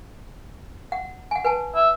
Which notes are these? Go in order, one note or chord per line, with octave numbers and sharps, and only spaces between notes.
F#5
F#5 G#5
B4 G#5 A5
E5